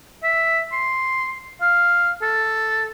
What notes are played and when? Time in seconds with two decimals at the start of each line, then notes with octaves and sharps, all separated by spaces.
0.23 E5
0.72 C6
1.61 F5
2.22 A4